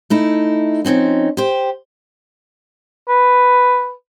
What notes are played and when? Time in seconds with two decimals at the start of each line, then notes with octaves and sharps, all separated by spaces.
0.10 A3 D#4 E4
0.85 F3 C4 C#4 D#4
1.37 G4 C5
3.09 B4